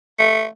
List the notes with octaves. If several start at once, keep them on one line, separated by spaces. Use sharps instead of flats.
A3